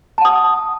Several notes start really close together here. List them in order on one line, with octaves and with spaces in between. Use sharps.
A5 F#5 D#6